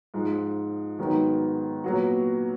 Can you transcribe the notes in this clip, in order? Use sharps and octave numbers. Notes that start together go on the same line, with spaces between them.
G#2 F3 G#3
G#2 D#3 F#3 B3
A#2 F#3 B3 F#4